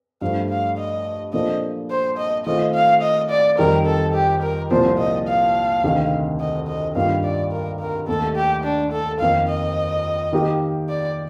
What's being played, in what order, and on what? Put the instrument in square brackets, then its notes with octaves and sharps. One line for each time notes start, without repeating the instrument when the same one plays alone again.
[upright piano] G2 F3 A3 [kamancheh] F5
[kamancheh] F5
D#5
[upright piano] A#2 F3 A#3 D4 A4 [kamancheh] D#5
[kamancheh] C5
D#5
[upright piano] D#3 A3 C4 F4 [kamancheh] D#5
[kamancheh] F5
D#5
D5
[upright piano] F2 D#3 G3 [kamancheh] A#4
[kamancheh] A4
G4
A#4
[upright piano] C2 A#2 F3 [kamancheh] C5
[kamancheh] D#5
F5
[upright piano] D2 C3 D#3
[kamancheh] D#5
D#5
[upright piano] G2 D#3 A#3 F4 [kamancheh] F5
[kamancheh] D5
A#4
A#4
[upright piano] D#2 D#3 A3 [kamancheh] A4
[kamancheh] G4
D4
A4
[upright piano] F2 D#3 A#3 [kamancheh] F5
[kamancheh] D#5
[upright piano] D#3 A#3 D#4 G4
[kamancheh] D5